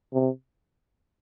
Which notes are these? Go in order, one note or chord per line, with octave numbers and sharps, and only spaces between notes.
C3